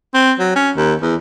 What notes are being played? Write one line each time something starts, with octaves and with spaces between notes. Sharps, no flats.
C4
F#3
C#4
D#2
E2